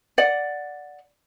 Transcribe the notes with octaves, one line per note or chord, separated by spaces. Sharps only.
D5 F#5